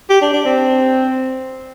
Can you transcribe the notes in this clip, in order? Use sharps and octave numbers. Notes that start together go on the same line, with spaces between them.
G4
D4
D4
C4